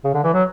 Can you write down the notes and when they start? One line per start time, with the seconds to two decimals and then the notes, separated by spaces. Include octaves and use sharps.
0.04 C#3
0.14 D3
0.24 E3
0.34 F#3